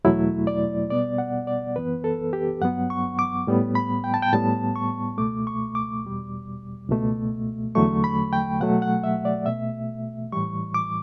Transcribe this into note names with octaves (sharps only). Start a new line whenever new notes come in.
E2 B2 F#3 A3 E4
D5
B2 G3 B3 D5
F#5
D5
F#2 E3 B3 B4
A4
G4
G2 F#3 B3 F#5
C#6
D6
A2 G3 B3
B5
G5
A5
G5
A2 G3 B3 A5
C#6
C#2 B2 A3 D6
C#6
D6
E2 B2 G3
C#2 B2 A3
E2 D3 F#3 A3 C#6
B5
G5
B2 F#3 A3 F#5
F#5
E5
D5
B2 A3 E5
A2 E3 G3 C#6
D6